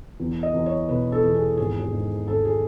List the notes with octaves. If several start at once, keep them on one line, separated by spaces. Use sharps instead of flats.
E2
D#5
E2
C#5
B2 B4
A4
E2
G#4
G#1 G#4
G#4
G#2
G#1 A4
G#4